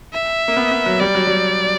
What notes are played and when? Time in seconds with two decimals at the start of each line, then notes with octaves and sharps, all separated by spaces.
0.13 E5
0.48 A#3
0.57 B3
0.71 B3
0.86 F#3
1.01 G3 D5
1.15 F#3
1.27 G3